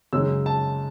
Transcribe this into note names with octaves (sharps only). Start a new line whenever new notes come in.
F#2 C#3 G#3 D#4 E6
A5